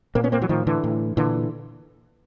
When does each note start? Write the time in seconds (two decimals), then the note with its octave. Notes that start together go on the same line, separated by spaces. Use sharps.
0.15 A#2 A#3 C4
0.24 B3 C#4
0.32 A#3 C4
0.41 E3 F#3
0.49 A2 D#3 F3
0.67 D3 E3
0.84 A2
1.17 A#2 D3 E3